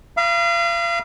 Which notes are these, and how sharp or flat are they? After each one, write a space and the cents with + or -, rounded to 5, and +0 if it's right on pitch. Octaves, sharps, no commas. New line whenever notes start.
F5 -35 B5 -40 D#6 -35